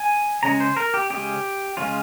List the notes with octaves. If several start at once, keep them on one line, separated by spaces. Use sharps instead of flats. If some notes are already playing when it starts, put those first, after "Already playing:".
Already playing: G#5
C#3 G#3 C#4 A#5
C5
A#4
G4
C#3 G#3 C#4 G4
C#3 G#3 C#4 F4